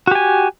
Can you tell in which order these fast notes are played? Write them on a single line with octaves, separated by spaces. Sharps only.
F#4 G4 G#5